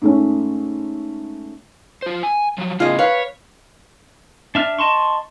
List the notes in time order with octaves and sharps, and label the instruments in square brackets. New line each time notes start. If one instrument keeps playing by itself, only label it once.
[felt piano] G#2 A3 C#4
[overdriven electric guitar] F4 C5
G#5
F3 F#3
[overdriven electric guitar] A2 C#3 [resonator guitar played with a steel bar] F4 G#4 D#5
[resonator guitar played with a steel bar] B4 F5 [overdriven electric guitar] C#5
[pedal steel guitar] D4 E5 F6
D#5 A5 C6 C#6